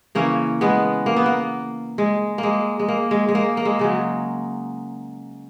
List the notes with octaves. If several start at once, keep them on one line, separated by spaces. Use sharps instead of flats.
C#3 E3 A#3 C#4
G#3 B3
A#3
B3
A#3
G#3
A#3
G#3
G#3
A#3
G#3
G#3
A#3
A#3
G#3
C#3 F#3 G#3